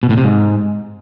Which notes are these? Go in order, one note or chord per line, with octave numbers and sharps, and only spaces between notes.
B2
A2
C3
G#2